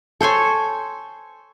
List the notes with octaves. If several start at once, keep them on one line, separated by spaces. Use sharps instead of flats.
A4 C5 C#5 G#5